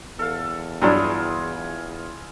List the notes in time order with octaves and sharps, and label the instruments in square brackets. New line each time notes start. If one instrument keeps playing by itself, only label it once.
[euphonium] E2 [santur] A4 F5
[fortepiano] G2 F#3 D4 [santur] E4 F4 G#4